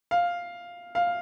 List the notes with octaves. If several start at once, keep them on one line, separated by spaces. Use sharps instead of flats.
F5
F5